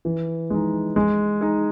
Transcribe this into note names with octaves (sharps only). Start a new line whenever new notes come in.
E3
G#3 D#4
G#3
D#4 G#4